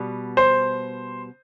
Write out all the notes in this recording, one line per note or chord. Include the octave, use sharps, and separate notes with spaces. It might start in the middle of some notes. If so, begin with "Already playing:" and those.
Already playing: B2 G3 B3
C5